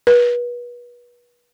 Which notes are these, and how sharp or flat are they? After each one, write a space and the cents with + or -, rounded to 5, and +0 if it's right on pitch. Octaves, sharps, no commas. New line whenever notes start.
B4 -30